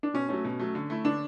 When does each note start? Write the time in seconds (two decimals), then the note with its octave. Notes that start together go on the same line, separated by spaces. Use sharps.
0.03 D4
0.14 B2 C#4
0.29 F#3 A3 C#4
0.45 B2
0.59 F#3 A3
0.75 D3
0.90 A3 E4
1.04 D3 D4